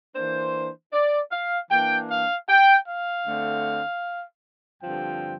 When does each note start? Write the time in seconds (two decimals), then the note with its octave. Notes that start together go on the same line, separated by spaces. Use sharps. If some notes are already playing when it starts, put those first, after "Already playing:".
0.15 E3 A#3 D4 C5
0.93 D5
1.32 F5
1.71 E3 A#3 D4 G5
2.10 F5
2.49 G5
2.88 F5
3.27 D3 A3 C4
4.82 G2 D3 F3 C4 G5